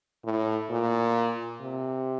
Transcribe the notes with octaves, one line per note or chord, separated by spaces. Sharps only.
A2
A#2
C3